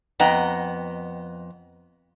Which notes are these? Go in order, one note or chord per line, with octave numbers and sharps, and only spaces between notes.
F2 B3 D#5 G5 A#5